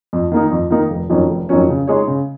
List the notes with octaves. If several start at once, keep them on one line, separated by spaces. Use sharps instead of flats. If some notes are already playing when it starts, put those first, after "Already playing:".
F2
D#3 A#3 D#4
F2
D#3 A#3 D#4
F1
F2 D#3 F#3 C#4
F1
F2 D#3 F#3 C#4
C#3
G#3 D#4 G#4 C#5
C#3